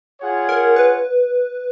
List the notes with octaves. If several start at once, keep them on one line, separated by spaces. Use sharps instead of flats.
F4 G#4 C#5 F#5
A#4
B4